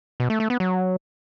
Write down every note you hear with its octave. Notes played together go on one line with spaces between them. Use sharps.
B2
A3
A3
B3
F#3